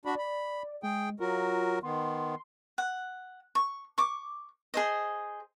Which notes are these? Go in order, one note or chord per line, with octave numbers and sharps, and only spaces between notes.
D4 F#4 D5 B5
B5
G#3 G#4 G5
F#3 F4 F#4 A#4
D#3 B3 C6
F#5
C#6
C#6 D6
G#4 C5 D#5